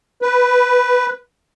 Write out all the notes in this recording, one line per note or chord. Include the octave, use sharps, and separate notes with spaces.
B4